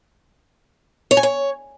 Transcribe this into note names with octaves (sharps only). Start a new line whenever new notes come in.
C#5
G#5
C#5